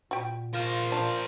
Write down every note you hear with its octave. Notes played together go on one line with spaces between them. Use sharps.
A#2 F#4 G4
F3 F4 A#4 C5
D4